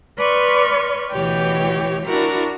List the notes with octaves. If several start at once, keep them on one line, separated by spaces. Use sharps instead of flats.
B4 D5 C6 C#6 F6
D2 B2 E3 G4 C#5 G5
D4 E4 F#4 A#4